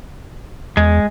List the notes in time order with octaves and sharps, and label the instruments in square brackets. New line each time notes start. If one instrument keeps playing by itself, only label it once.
[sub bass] E2 [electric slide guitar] G#3